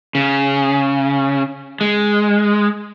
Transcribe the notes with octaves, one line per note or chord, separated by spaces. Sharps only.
C#3
G#3